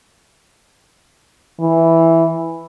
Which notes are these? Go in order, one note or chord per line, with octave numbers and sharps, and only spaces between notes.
E3